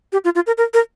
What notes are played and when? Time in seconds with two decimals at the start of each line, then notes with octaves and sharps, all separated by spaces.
0.13 G4
0.24 F4
0.35 F4
0.47 A#4
0.58 A#4
0.74 A#4